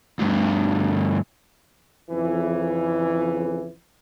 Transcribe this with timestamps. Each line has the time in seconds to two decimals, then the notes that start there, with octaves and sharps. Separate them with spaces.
0.19 D2 G2
2.11 F2 C#3 E3